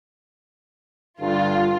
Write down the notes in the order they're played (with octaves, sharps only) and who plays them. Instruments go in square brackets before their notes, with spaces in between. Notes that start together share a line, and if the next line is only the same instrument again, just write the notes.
[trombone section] G2 D3 [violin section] F4